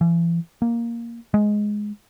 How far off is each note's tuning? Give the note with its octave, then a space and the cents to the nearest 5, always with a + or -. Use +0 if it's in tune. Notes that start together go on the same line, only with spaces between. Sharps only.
E3 +40
A#3 +5
G#3 +5